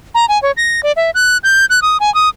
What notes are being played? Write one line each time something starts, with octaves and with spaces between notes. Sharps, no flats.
A#5
G#5
C#5
A#6
D5
E5
F#6
G6
F#6
D#6
G#5
D#6